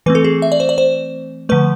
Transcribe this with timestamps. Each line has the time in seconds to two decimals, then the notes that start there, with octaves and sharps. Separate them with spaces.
0.06 E3 A3 C4 B4
0.15 A4
0.24 G#4
0.42 E5
0.52 D5
0.60 C5
0.69 D5
0.78 C5
1.49 D3 F3 A3 B4